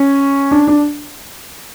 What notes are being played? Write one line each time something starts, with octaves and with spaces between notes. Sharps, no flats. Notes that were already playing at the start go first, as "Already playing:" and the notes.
Already playing: C#4
D4
D4